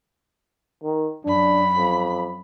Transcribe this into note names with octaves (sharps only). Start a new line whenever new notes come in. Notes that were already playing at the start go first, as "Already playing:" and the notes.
D#3
F#2 D4 B5
F2